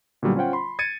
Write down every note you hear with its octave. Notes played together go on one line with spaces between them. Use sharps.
A#2 D3 F#3 G3 B3
C#4 F4 C5 F#5 G5
B5 C6
G#6 A6 C#7 D#7